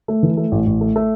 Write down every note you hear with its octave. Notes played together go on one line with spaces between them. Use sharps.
A3
E3
A3
A1
A1
A3
A3